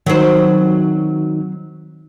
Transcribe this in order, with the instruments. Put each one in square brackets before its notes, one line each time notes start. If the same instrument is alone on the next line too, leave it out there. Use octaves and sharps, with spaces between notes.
[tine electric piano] D#3 D#4 [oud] F#3 C4